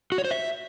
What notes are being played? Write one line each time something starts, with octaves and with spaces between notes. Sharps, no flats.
F#4
C#5
C5
E5